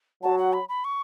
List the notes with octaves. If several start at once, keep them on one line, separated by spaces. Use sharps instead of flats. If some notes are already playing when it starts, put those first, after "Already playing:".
F#3 A5
F#5
B5
B5
C#6